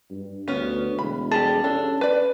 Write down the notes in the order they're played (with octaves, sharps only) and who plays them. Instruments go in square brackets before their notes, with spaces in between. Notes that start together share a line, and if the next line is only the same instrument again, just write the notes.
[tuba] G2
[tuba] D2 [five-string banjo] B3 C#4
[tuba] E1 [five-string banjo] B5
[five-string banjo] G3 G4 G#4 [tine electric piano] A5
[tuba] C#4 [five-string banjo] D4 A4
[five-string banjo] B4 D5